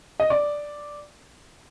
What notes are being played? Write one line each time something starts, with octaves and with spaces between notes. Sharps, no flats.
D#5
D5